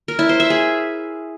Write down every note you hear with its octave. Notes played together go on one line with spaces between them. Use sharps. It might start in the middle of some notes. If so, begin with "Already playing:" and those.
A#4
E4
C5
E5
G#4